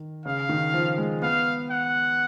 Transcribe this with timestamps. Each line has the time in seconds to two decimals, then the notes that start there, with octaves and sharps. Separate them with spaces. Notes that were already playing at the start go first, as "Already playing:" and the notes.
Already playing: D#3
0.26 C#3 F5
0.49 D#3
0.74 F3
0.98 G#3
1.22 B3 F5
1.71 F#5